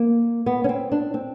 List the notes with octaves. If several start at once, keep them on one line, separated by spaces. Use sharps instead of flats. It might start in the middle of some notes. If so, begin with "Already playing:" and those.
Already playing: A#3
B3
C#4
C4
D4
C4